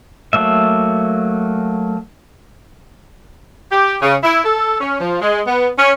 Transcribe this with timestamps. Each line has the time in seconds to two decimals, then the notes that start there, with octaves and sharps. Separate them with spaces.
0.33 F#3 A3 A#3 E5
3.71 G4
4.02 C#3
4.23 E4
4.44 A4
4.81 C#4
5.00 F3
5.21 G#3
5.46 B3
5.78 C#4